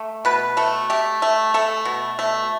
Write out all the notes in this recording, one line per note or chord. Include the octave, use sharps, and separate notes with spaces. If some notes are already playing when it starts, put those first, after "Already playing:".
Already playing: A3
B2 B4
A3 A4
A3 G4
A3
A3 A4
B2
A3